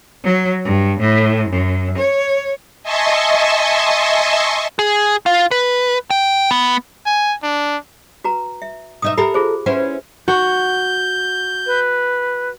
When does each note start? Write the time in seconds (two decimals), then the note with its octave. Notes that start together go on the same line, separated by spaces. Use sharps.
0.24 F#3
0.64 G2
1.00 A2
1.49 F#2
1.98 C#5
2.83 D#5 E5 G#5 A5 C6 C#6
4.79 G#4
5.26 F4
5.51 B4
6.11 G5
6.51 B3
7.06 G#5
7.43 D4
8.24 F#4 B4 A#5
8.62 E5
9.02 B2 D#4 E5 D#6
9.18 G4 A4 A#4 E5 B5
9.34 F4 G#4 C5
9.66 C#4 E4 B4 C5 F#5
10.28 F#4 G6
11.66 B4